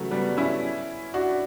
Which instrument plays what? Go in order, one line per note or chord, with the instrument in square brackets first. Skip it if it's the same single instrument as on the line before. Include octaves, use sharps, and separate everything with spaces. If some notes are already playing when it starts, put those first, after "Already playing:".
Already playing: [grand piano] C#3 E3 F#3 A3
G3 B3
C#4 E4
D4 F#4